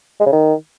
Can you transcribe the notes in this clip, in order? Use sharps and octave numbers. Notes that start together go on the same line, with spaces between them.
G#3
C#3
D#3